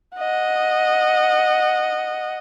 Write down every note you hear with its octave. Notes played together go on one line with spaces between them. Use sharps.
D#5 F#5